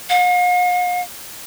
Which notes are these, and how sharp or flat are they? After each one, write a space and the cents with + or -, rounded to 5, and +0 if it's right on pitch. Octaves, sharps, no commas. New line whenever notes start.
F5 +45